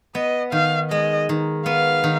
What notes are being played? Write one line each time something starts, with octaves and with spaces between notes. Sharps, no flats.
B3 D#5
D#3 F5
G#3 D#5
D#3
B3 F5
D#3